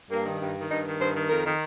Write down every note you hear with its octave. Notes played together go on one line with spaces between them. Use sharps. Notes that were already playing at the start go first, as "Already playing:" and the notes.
G2 A#3
D#3
G2
D#3
G2 D#4
D#3
G2 C5
D#3
F2 A#4
D#3